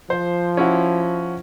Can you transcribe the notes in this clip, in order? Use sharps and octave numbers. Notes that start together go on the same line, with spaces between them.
F3 C5
C#4 E4 F#4